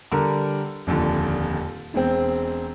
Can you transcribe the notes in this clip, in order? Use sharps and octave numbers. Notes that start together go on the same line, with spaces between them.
D3 G3 A#4
D#1 F2 D3
E1 G#3 C4